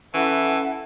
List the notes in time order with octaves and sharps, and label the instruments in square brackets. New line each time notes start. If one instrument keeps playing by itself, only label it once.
[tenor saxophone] E3 [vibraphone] C#4 [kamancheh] E4 A4 [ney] F#5